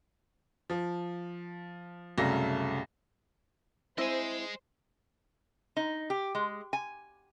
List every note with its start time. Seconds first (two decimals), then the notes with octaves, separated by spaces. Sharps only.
0.70 F3
2.18 C2 F#2 C#3 A3 A#6
3.98 C4 E4 C5 D#5 G#5
5.77 D#4
6.10 G4
6.35 G#3
6.73 G#5